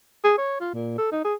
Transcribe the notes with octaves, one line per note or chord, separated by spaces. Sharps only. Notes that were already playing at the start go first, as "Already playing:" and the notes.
G#4
C#5
F4
A#2
A4
D#4
G#4